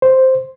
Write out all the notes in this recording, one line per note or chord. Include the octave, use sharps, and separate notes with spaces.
C5